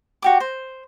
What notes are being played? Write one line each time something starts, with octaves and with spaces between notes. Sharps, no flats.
F#4 G4 D6
C5